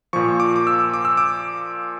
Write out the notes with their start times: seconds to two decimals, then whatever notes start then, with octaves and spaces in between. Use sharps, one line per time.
0.13 A#2 F3 C#6
0.40 D6
0.56 D6
0.67 E6
0.94 D6
1.05 E6
1.17 D6